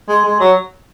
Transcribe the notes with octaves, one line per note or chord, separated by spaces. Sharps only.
G#3
G#3
F#3